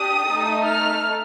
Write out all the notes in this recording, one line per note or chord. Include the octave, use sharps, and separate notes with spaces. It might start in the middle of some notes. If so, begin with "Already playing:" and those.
Already playing: D4 G4 D#6
A3 D#4 A4
F6